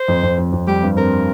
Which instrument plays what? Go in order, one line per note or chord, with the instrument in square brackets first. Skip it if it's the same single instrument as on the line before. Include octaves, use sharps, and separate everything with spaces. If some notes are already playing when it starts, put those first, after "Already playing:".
Already playing: [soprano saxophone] C5
[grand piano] F2
F2
F2
F2
[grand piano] G3 [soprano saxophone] G4
[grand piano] G2
[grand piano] C4 [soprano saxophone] A#4